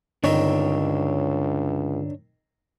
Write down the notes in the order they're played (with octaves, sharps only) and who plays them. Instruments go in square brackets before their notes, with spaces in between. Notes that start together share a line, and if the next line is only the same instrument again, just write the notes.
[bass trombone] C#2 [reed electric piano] G2 D3 [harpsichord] D#3 C4 D#4 [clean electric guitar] D4 C#5